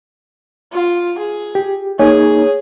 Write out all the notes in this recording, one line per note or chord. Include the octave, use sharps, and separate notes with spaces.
F4
G#4
G4
A#3 D#4 G#4 C#5 G#5